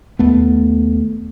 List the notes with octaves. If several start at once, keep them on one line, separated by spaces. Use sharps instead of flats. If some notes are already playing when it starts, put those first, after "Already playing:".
D#2 A3 B3